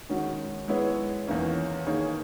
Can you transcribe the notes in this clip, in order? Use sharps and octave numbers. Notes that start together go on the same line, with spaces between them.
D#3 G#3 C#4 F#4
G#3 B3 E4 G#4 C#5
E2 D#3 A#3 C#4
D#3 A#3 D#4 G#4 C#5